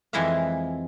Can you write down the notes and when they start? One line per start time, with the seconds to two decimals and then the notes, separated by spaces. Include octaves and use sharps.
0.13 F2 E3 G#3 E4 E5 F5